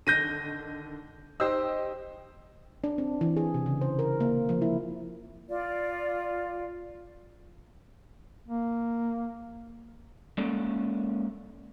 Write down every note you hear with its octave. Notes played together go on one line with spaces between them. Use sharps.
D3 D#3 G6 A#6 D#7
D#4 G4 C5 E6
D4
C4
E3
G#4
C3
C#3
C5
A#4
A#3
F3
E4
F4 D5
A#3
G#3 A#3 C#4 A4 D5